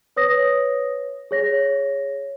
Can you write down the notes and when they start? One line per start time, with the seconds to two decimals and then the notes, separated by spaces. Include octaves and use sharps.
0.16 B4 C#5 D#6 A#6
1.31 G#4 C#5 A#6